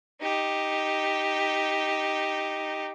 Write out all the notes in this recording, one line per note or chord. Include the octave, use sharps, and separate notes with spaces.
D#4 G4